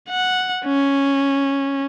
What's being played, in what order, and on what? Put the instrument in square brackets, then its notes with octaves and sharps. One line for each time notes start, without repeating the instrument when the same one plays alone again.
[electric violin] F#5
C#4